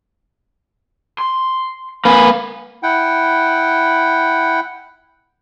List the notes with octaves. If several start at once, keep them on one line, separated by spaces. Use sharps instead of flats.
C6
A#3 B4 G#5
E4 F#5 G5